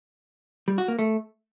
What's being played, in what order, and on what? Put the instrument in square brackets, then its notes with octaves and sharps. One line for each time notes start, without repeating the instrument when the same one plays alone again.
[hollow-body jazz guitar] G3
F#4
A#3
A3